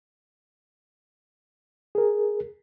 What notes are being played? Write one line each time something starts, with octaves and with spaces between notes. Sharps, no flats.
G#4 A#4